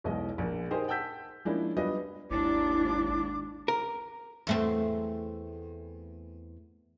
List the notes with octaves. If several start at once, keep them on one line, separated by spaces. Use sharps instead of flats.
B1 E2 B2 G#3 D#5
A#1 A#4
D#4 G4 G#4 A#4 C5
F#5 G5 A5 E6 G6 B6
F3 G#3 A#3 C#4 D4 E4
F#3 G3 B3 D4 F4 D#5
G#1 D#2 G#2 D4 E4 D6
A#4
E2 A3 C4